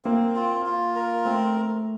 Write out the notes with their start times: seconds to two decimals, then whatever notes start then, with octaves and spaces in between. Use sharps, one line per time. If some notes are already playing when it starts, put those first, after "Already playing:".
0.05 A#3 C4
0.36 F4
0.66 F4
0.96 A#4
1.25 A3 C4